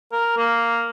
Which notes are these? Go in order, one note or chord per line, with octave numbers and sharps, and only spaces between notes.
A#4
A#3